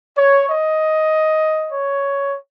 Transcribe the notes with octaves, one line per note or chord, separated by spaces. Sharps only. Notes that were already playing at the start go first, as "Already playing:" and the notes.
C#5
D#5
C#5